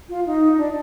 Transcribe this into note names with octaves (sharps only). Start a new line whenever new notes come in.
F4
D#4
D4